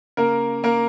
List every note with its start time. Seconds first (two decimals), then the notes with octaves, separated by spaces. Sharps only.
0.17 C#3 A#3 A#4
0.64 A#3 A#4